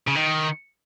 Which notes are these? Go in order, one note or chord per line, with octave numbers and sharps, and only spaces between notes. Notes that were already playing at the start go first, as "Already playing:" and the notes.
C#3
D#3